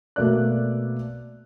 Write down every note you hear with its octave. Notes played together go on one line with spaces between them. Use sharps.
B2 A3 A#3 F#4 D5 F#6